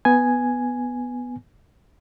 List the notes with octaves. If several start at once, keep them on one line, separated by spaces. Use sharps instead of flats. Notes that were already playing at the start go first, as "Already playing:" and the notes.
B3 G#5